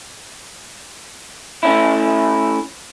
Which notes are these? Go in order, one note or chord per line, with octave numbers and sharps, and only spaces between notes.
A3 C#4 E4